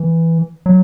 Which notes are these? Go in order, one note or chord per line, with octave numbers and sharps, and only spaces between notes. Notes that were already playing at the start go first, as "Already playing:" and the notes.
Already playing: E3
F#3